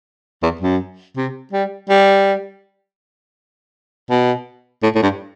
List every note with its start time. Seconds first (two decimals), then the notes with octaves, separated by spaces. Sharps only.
0.43 E2
0.61 F#2
1.16 C3
1.53 G3
1.89 G3
4.10 B2
4.83 A2
4.95 A2
5.02 G2